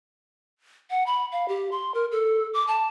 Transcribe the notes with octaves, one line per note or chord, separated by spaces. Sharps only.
F#5
B5
F5
G4
C6
A#4
A4
D6
A5